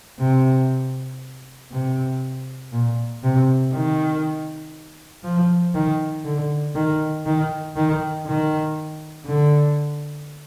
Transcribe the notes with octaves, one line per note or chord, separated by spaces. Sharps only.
C3
C3
A#2
C3
D#3
F3
D#3
D3
D#3
D#3
D#3
D#3
D3